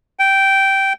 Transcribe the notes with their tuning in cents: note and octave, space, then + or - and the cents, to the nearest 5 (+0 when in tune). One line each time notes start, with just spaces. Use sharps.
G5 -10